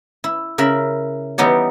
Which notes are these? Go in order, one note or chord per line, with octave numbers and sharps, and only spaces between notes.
E4
C#3 A#4 E5 B5
E3 G3 B3 D#4 G4 C#5